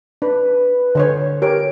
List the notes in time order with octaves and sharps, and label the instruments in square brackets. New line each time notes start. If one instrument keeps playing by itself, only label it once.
[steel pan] D4 [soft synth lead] B4
[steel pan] D3 C5 C#5
[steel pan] G4 A#4 C#5 [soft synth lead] D7